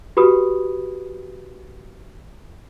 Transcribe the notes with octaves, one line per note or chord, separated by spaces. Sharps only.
F#4 G4 B4 B5 D#6